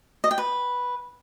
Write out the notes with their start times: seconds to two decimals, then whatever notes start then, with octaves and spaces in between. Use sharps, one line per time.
0.24 D#5
0.31 G5
0.38 B4